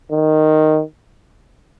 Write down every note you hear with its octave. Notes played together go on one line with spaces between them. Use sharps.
D#3